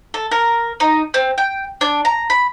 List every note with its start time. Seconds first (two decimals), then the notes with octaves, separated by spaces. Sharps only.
0.14 A4
0.31 A#4
0.80 D#4
1.14 C4
1.38 G5
1.81 D4
2.05 A#5
2.30 B5